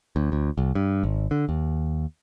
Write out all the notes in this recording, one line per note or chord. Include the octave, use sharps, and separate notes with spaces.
D2
D2
C2
G2
G#1
D3
D#2